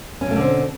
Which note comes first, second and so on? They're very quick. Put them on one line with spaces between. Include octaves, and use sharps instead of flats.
C#4 B2 A3 D3 C4